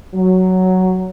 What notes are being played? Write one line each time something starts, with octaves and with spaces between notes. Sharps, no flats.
F#3